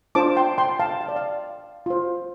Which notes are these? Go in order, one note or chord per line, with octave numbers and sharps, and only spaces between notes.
D4 F4 C5 A5 D6
G5 C6
G5 C6
F5 A5
F5
D5
F5
F4 C5